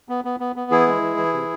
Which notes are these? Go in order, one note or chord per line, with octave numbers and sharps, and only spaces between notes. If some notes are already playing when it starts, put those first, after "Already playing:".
B3
B3
B3
B3
E3 E4 G#4
G#3
E3
E3
C3